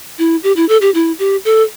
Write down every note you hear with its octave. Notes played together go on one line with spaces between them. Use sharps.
E4
G4
E4
A4
G4
E4
G4
A4